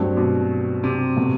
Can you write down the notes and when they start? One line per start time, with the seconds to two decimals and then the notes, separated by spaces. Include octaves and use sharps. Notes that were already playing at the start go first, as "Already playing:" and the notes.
Already playing: G2 F#3 A3 C4
0.17 B2
0.84 C3
1.17 B2 A3